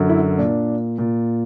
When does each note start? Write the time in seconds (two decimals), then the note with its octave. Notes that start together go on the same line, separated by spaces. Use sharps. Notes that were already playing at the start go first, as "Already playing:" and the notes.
Already playing: F#2 D3
0.09 E4
0.38 A#2 D4
0.98 A#2